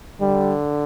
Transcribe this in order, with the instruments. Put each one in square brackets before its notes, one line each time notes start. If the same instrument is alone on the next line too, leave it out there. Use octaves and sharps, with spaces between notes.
[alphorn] D3 [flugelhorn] G3